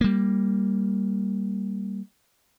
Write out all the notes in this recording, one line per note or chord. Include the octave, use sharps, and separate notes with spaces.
G3 A#3